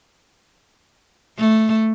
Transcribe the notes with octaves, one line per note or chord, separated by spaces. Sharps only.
A3